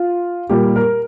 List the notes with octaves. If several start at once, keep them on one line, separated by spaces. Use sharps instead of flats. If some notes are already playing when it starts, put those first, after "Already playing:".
Already playing: F4
A#2 G3 A#3 G4
A#4